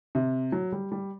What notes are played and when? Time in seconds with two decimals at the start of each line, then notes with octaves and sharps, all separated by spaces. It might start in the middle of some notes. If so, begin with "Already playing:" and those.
0.15 C3
0.52 F#3
0.72 G3
0.92 G3